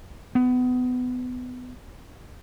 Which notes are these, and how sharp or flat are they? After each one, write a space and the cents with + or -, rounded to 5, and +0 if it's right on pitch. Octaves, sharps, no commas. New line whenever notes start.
B3 +25